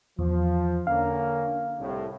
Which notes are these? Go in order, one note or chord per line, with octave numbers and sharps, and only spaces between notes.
E2 F3
D3 A#3 C#4 F5
C2 A2